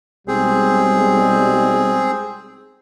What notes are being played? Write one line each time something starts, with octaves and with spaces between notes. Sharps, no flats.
B1 G3 G#3 C4 G#4